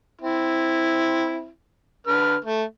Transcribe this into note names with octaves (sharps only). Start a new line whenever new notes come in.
C4 E4
D3 B4 F6
A3